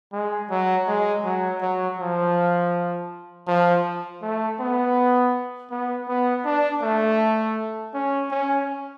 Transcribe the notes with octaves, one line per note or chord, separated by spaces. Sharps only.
G#3
F#3
G#3
F#3
F#3
F3
F3
A3
B3
B3
B3
D4
A3
C#4
C#4